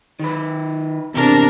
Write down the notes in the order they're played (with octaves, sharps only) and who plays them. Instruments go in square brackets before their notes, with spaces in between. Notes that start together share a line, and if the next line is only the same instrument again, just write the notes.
[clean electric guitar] D#3 B4
[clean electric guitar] E2 [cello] C3 D4 [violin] A#4 A#6